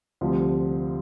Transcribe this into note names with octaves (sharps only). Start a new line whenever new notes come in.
D2 C3 F3 G3 F4